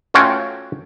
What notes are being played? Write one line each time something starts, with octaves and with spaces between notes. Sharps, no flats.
A3 C#4 F4 F#4 C#5 G5